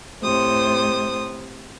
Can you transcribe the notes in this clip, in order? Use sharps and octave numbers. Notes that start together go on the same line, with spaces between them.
A2 C3 C5 D#6